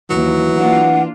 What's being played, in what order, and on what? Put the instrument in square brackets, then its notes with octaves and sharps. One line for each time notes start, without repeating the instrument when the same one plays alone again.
[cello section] D#2 [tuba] E3 [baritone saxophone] F#3
[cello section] A#3 D4 F4 [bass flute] F#5